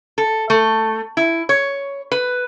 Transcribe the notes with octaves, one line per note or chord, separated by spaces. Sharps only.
A4
A3
E4
C#5
B4